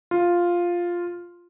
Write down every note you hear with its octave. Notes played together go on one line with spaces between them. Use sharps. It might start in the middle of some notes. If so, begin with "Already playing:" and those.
F4